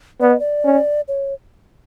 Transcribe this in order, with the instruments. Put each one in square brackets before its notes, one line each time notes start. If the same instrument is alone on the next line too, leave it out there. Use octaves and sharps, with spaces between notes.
[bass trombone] B3 [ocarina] D5
[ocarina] D#5
D5
[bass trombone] C#4
[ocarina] C#5